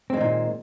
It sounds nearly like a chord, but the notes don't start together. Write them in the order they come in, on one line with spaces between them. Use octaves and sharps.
C4 G#3 D#3 A#2